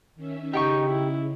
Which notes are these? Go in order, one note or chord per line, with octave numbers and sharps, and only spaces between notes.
D#3 C#4 E5
C#3 D#4 G4 G5 C#6
E4